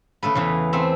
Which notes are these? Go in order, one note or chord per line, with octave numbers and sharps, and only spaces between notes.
C#3 A3 A4 B4
E2 C#3 E3
A3 C4 E5